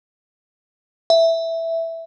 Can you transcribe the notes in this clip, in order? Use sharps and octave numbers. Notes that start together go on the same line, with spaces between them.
E5